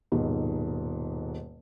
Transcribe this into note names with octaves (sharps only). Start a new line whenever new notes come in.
D#1 G#2 B2